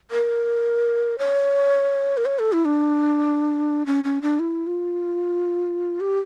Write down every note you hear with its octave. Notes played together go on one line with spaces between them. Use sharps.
A#4
C#5
A#4
C#5
A4
E4
D4
C#4
C#4
D4
E4
F4
G4